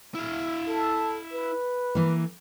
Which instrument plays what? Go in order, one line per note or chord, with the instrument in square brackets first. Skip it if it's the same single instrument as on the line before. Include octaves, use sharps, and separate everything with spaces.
[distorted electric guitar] E4 F5
[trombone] A4
B4
[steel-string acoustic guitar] E3 A#3